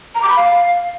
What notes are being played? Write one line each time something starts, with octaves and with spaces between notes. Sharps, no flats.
A#5
D6
B5
F5